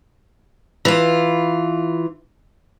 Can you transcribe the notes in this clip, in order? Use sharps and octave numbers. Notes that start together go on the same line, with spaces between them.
E3 F4